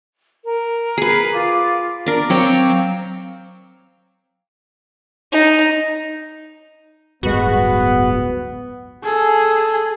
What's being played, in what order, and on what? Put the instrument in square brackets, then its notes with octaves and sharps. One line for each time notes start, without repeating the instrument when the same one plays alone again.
[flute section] A#4
[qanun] G#4 B4
[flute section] F4 D6
[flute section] D4 [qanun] A#4 D5
[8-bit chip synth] F#3 C4 C5 [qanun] C#5 G5 [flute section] F5 D6
[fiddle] D#4
[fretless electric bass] D1 G1 G#3 [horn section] B3 [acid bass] F#4
[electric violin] G#4 A4